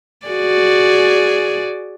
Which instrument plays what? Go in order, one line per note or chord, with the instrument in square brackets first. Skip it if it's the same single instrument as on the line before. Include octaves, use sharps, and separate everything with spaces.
[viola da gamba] F#4 G#4 D5